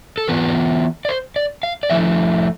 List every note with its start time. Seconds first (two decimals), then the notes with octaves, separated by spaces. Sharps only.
0.18 A4
0.28 E3 B3 F4 B4
1.05 D5
1.08 C5
1.36 D5
1.63 F5
1.83 D5
1.90 F3 A3 E4 E5